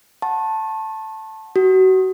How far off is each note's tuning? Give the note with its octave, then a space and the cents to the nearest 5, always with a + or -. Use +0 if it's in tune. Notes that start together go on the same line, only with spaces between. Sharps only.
F#5 +0 A5 +0 C#6 -40
F#4 +30 D#6 +15